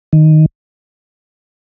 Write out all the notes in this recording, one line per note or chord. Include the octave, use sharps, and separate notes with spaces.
D#3